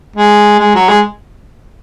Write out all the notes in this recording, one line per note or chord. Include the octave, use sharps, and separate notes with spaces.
G#3
G#3
F#3
G#3